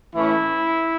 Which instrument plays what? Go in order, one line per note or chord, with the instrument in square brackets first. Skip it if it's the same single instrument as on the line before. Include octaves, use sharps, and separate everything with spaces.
[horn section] A2 E3 A3 C#4 E4